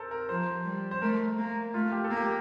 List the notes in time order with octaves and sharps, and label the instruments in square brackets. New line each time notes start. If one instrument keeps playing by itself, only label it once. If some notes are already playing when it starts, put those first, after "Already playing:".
Already playing: [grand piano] A4 A#4 C5
A#4
[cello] F3 [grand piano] C5
[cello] G3
[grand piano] C5
[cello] A3 [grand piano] A#4
[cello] A#3
[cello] A3 [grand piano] F4
[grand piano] G4
A4
[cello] A#3
[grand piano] G4